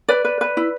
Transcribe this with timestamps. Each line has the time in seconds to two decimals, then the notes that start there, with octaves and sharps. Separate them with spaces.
0.08 B4 D5
0.25 B4
0.41 B4
0.57 E4